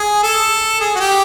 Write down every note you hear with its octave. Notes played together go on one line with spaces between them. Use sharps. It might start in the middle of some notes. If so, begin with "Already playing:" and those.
Already playing: G#4
A4
G#4
F#4
G4